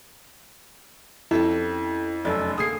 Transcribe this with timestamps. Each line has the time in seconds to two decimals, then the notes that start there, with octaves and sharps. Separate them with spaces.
1.31 F2 C#4 E4 G4 A4
2.25 F1 F#2 A4 D5
2.58 D3 A#3 G#4 D#6 C7